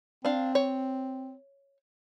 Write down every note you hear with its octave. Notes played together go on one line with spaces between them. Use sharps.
C4 D4 F5
C#5